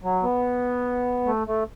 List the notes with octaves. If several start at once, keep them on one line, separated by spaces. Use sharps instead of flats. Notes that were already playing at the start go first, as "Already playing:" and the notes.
F#3
B3
A3
A3